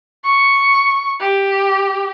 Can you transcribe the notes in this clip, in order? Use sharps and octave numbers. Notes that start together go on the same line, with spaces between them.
C#6
G4